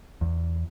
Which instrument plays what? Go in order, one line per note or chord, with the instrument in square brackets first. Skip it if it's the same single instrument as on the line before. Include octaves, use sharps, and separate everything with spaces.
[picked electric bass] E2